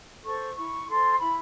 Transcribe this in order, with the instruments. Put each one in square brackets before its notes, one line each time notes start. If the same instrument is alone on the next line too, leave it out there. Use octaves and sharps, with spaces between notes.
[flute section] A4 C5 C#6
E4 C#6
A4 C5 C6
E4 B5